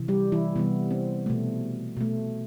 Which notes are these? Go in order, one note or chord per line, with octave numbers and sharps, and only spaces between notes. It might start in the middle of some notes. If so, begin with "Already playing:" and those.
Already playing: C3 E3
G3 G4
E3 E4
C3 E3 G3 B3
C4
B2 A3
B2 A3